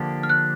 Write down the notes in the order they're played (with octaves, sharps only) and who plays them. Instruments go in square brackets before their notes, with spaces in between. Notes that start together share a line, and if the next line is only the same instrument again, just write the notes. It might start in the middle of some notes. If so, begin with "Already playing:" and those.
Already playing: [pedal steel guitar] D3 F3 A#3 D4 G4
[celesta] F6
F#6